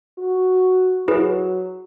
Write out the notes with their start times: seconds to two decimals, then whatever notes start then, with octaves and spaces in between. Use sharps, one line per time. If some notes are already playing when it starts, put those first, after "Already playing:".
0.18 F#4
1.08 F#3 E4 G#4 B4